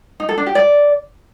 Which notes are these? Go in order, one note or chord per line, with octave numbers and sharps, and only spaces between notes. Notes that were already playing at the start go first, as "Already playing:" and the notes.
D#4
A4
D4
G4
D5